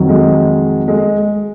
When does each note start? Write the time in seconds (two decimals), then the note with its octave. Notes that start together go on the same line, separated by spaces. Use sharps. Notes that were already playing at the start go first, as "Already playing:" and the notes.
Already playing: F2 D#3 F#3
0.09 G#3
0.88 G#3